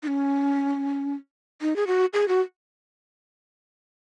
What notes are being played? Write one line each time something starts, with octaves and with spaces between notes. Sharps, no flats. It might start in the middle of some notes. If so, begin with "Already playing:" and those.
D#4
C#4
D#4
G#4
F#4
G#4
F#4